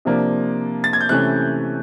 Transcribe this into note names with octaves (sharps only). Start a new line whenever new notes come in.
C3 F3 A#3 D4
A6
G#6
G6
C3 E3 A3 C#4 F#6